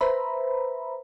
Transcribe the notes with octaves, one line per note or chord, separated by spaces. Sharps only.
B4 C5 E5 A#5 B5